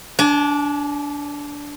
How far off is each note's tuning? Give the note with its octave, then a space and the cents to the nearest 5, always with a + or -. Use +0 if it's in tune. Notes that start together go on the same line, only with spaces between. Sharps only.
D4 -15 G#5 +35